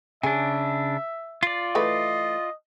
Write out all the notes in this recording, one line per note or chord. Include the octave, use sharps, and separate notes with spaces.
C#3 D4 G#4 E5
F4 D5
E3 A3 B4 D#5